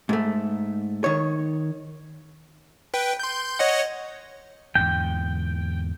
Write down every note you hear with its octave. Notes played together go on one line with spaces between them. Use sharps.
G#2 A3
D#3 C#5
B4 G5
C6 G6
C#5 D#5 F#5
E2 G#2 D3 G5